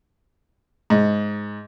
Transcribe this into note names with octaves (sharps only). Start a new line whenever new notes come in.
G#2